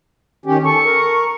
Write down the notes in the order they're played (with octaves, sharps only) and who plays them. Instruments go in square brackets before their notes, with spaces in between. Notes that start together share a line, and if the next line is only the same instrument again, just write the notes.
[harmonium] D#3 C#4 G4
[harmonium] A4 [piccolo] C#6
[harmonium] A#4